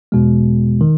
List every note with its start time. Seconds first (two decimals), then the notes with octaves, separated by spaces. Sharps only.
0.12 E2 B2 G#3
0.81 D#3